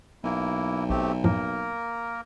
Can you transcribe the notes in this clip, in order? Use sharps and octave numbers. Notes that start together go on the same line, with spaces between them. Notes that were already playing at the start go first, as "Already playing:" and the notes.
B1 A#3 E4
A#1 A3 C4 G4
F#2 A2 F3 A#3 A#4